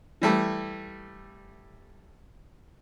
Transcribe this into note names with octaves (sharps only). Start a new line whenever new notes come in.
E3 G3 A3